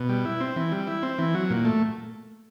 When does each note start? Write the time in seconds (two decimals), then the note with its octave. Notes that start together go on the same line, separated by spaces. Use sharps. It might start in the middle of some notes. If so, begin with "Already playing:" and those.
Already playing: B2
0.09 G3
0.25 E4
0.40 C4
0.56 E3
0.72 G3
0.87 E4
1.02 C4
1.19 E3
1.35 F#3
1.50 A#2
1.65 A3